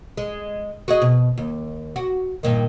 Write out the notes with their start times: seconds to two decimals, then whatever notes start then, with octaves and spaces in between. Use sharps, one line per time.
0.17 G#3
0.88 F#4 G#4 D#5
1.02 B2
1.38 D#2
1.96 F#4
2.43 G2 A#2 D#3